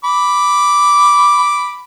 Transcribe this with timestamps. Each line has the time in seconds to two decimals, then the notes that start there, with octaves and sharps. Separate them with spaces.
0.04 B5 D6